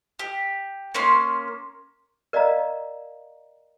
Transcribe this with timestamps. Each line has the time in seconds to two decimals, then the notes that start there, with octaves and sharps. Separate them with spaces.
0.19 G4
0.94 A#3 C#4 C6
2.33 A#4 D5 D#5 F5 A#5